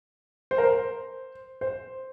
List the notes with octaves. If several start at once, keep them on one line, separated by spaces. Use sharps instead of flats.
C5
A#4
C5
C5